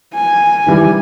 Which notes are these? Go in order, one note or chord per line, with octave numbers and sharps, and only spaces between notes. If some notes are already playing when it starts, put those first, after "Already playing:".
G#5
D#3 E3 G3